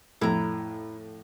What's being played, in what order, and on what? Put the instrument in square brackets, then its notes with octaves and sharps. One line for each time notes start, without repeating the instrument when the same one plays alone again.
[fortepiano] F2 A2 [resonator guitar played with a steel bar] E4 A#5